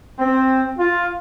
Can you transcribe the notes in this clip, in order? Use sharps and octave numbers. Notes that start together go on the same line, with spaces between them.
C4
F4